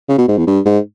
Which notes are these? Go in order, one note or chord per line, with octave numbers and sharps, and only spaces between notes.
C#3
B2
G#2
E2
G2
G#2